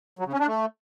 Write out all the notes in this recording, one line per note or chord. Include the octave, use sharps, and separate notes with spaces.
F#3
C#3
C#4
D4
A3